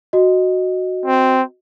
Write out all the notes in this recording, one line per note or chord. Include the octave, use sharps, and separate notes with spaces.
F#4 D#5
C4